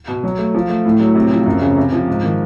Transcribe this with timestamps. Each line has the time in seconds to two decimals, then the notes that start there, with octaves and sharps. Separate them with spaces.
0.08 B2
0.23 F#3
0.38 A3
0.54 F3
0.69 A3
0.85 A2
1.00 F#3
1.15 C3
1.31 F3
1.46 F#2
1.61 C#3
1.77 C3
1.92 F3
2.08 G#2
2.23 D#3